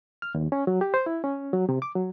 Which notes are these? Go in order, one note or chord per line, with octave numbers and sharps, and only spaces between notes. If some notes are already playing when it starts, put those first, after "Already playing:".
F6
D#2
C#4
F#3
G4
C5
E4
C#4
F#3
C3
D6
F#3